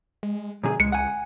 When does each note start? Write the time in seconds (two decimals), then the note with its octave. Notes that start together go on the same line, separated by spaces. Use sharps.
0.23 G#3
0.64 F#2 B2 D3 G#4
0.80 C#2 G#3 C#7
0.92 F#5 G#5